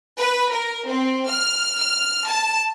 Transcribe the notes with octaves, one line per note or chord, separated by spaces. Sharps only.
B4
A#4
C4
F6
F6
A5